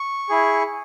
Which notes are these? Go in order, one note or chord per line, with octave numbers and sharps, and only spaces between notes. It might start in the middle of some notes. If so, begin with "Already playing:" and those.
Already playing: C#6
E4 G#4